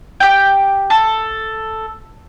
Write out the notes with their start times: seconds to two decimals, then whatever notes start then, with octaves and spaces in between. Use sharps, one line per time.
0.20 G4 G5
0.90 A4